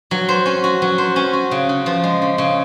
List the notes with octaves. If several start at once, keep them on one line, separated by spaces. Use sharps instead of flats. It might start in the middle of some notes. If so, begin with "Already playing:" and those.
F#3
C5
C#4
F#4
F#3
C5
C#4
F#4
C#3
C#3
F3
G#3
C#3
C#3